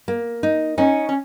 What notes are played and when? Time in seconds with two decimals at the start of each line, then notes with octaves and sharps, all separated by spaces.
0.08 A#3
0.43 D#4
0.78 C#4 D#4
1.09 C#4